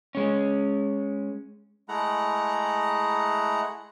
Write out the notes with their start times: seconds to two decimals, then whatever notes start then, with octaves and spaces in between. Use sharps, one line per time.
0.15 G#3 C#4
1.89 G#3 A3 E4 F#5 A#5 F#6